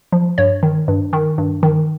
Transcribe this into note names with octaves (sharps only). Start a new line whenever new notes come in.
F3
G2 C#5
D#3
G2
D#3
G2
D#3